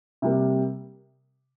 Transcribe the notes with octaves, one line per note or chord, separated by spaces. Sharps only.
C3 G3 A#3